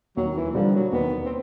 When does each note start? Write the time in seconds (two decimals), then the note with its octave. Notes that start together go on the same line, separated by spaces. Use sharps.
0.17 D#2 F#3
0.36 E3
0.54 D3 F3 G3 A#3 D4
0.74 F#3
0.92 D#2 B3
1.26 C4